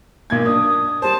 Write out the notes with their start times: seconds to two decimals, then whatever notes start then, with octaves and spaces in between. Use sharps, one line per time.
0.30 B1 A#2 G#6
0.45 D4 D#6
1.02 G3 C5 A5